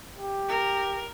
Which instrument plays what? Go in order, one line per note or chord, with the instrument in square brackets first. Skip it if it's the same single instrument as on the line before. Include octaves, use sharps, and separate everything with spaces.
[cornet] G4
[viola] A#4